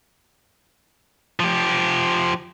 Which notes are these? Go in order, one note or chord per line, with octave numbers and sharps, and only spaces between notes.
F3 G4